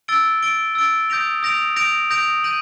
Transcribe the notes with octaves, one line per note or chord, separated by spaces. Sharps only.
E6 A6 D7 G7
E6 A6 D7 G7
E6 A6 D7 G7
D#6 G6 A#6 D7 F7
D#6 G6 A#6 D7 F7
D#6 G6 A#6 D7 F7
D#6 G6 A#6 D7 F7
G6 A#6 D#7 F#7